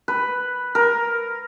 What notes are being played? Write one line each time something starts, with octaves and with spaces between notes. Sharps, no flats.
B4
A#4